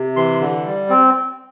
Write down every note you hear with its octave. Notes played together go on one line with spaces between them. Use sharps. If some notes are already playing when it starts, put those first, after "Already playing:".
Already playing: C3
E3 C6
D3
G3
C4